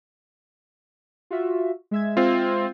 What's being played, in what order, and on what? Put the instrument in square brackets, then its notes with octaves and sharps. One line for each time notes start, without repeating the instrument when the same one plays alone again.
[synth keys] F4 F#4 E5
G#3 E5 G#6
[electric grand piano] C4 F4